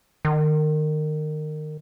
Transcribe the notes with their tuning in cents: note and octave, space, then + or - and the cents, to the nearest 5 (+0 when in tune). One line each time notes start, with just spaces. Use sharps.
D#3 -25